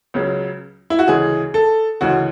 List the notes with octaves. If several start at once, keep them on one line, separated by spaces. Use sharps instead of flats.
C#2 C#3 F#3
E4
F#4
D2 C#3 E3 G#3 G#4
A4
D2 C#3 E3 G#3 F#4